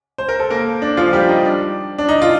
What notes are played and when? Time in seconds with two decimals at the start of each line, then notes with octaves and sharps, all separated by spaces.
0.18 C5
0.29 A#4
0.40 A4
0.50 A#3 A#4
0.82 D4
0.97 F3 F4
1.13 G3 G4
1.29 D#4
1.45 D4
1.98 D4
2.09 D#4
2.22 F4